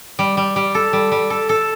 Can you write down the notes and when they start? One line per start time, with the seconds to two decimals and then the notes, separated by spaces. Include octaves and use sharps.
0.19 G3
0.37 G3
0.56 G3
0.75 A4
0.93 G3
1.12 G3
1.30 A4
1.49 A4